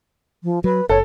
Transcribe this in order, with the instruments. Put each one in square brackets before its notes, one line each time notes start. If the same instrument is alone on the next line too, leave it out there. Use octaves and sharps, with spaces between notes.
[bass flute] F3
[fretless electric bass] F#3 [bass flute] B4
[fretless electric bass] F#1 [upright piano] A4 [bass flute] C#5